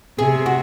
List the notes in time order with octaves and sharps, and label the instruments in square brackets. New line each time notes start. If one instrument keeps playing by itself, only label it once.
[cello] C3 [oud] G#4
[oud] F#4